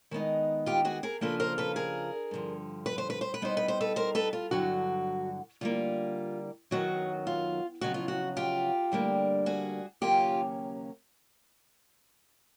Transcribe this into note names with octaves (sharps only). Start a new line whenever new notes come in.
D#3 G#3 B3 D#4
F4 G4
F#4 G#4
G#4 A#4
C#3 F3 A#3 D4 F4 A4 B4
A#4 C5
A4 B4
G#4 A#4
G2 D3 F3
B4
C5
B4
C5
B4
B2 G3 B3 D#4 C5
B4
C5
A4 B4
A#4 C5
A4 B4
F4
G2 D3 F#3 F#4
D3 G3 A#3 F4
F#2 D#3 F#3 B3 F#4
F4
F2 C#3 F#3 B3 F#4
F4
F#4
F4 G4
D2 D3 G3 A#3 D4
F#4 G#4
D#2 C#3 F#3 A#3 C#4 F4 G4